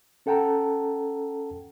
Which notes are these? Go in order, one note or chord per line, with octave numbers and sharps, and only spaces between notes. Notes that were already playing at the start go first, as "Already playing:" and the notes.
C#4 A4 F#5 G5 A5 A#5